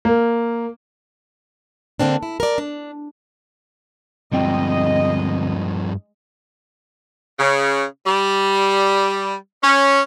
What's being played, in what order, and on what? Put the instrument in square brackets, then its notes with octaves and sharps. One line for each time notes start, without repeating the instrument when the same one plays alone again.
[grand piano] A#3
[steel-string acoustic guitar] D3 A#3 C4 D4
E4
A#4 D5
D4
[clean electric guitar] D2 C4 G5 [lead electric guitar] G2 F3 [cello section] G#3 D#5
[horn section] C#3
G3
C#4